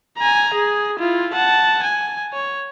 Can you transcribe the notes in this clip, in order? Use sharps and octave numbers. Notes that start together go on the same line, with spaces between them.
G#5 A#5
G#4
E4 F4
F#5 A5
G#5
C#5